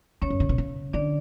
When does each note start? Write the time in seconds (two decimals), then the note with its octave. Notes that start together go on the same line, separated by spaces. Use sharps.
0.22 E2 C#4 C#5
0.30 F#2
0.40 D3
0.49 B2
0.58 C#3
0.93 D3 D4 D5